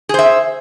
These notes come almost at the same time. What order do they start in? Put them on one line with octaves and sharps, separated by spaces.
G#4 C5 E5